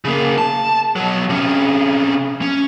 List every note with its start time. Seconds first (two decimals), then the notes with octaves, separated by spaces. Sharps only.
0.05 C#3 A#3
0.38 A5
0.96 B2 F#3
1.29 C3 C#4
2.42 C#4